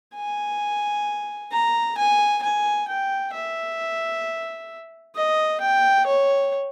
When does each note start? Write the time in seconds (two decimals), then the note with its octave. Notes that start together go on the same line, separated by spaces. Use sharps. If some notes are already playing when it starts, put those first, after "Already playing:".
0.15 G#5
1.52 A#5
1.97 G#5
2.43 G#5
2.88 G5
3.33 E5
5.15 D#5
5.61 G5
6.06 C#5